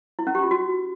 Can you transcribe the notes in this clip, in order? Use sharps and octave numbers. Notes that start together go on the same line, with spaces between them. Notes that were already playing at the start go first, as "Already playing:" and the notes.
E4
C#4
G4
F4
F#4